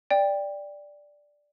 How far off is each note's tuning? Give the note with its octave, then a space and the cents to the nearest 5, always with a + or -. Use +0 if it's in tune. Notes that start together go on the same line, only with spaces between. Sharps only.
D5 +0 G5 +15